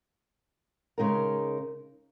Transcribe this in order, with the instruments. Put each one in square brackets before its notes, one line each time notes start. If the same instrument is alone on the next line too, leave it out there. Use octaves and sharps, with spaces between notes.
[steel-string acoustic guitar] C#3 G#3 D#4 A#4